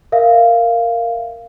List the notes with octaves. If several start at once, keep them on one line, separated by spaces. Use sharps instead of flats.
A#4 E5 F5